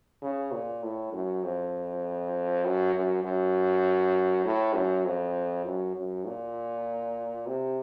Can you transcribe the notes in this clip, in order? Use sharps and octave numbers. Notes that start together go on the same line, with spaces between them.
C#3
A#2
A2
F#2
F2
F#2
F#2
F#2
A2
F#2
F2
F#2
F#2
A#2
C3